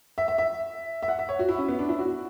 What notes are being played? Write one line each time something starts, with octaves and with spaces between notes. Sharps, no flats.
E5
E5
E5
E5
F#5
E5
C#5
F#4
E4
C#4
B3
D4
E4
F#4